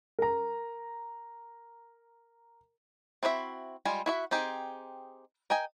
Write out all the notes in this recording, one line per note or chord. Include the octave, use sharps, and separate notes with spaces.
A#4 A#5
C4 E4 F#4 D5 E5
G3 G#3 F4 G#5
E4 F#4 E5
C4 D#4 G4 G#4
A#4 D#5 G5 G#5